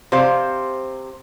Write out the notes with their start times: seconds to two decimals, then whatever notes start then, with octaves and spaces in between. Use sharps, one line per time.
0.12 C3 C5 F5